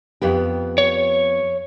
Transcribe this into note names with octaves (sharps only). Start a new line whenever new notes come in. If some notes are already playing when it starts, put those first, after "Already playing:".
F2 B3 G4
C#5